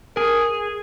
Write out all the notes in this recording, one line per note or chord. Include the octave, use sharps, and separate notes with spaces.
G#4 A#4